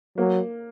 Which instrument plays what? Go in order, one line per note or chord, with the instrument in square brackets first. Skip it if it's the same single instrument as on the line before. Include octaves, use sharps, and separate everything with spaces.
[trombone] F#3 [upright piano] A#3